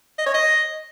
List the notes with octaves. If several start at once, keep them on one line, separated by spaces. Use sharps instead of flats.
D#5
C#5
D#5